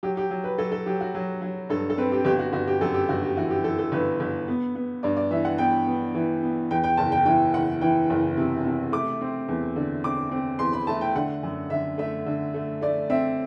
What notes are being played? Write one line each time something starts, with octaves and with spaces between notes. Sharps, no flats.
F#3 G4
G4
F#3
B4
F#3 A4
A4
F#3 G4
F#4
F#3
F#3
G2 A4
A4
C4 B4
G4
G1 G4
F#4
G1 F#4
G4
F#2 A4
G4
G1 F#4
G4
E3 F#4
G4
E3 A4
A4
G1 B4
G1
B3
B3
G2 D5
D5
E3 E5
F#5
B3 G5
B3
E3
B3
E2 G5
G5
F#1 A5
G5
E3 G5
F#1 F#5
E3 G5
F#1
C3
C3
A3 D6
C4
E2
D3
C4 D6
C4
E2 C6
B5
A3 A5
G5
D3 F#5
F#2
D3 E5
A3 E5
D3
A3
A3 D5
C4 E5